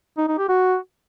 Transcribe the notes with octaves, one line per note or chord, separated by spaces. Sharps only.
D#4
D#4
G4
F#4